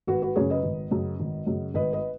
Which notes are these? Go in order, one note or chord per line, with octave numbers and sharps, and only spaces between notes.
G#1 F#4 B4
F#4 B4
F#2 C#3 G#4 C#5
B4 D#5
G#1
F#2 C#3
G#1
F#2 C#3
G#1 B4 D#5
B4 D#5